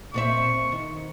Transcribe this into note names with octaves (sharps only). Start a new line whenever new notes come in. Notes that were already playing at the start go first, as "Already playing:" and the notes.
A#2 C4 E5 C#6
D#3